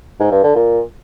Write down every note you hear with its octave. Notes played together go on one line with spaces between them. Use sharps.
G#2
G2
D3
A#2